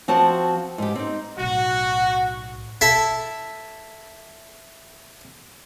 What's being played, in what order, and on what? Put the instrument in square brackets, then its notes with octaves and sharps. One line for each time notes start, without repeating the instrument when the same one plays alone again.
[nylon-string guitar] F3 C4 F#4 C5 A5
G#2 G4
C4 D#4
[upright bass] B1 A2 [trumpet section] F#4
[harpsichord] E4 A4 E5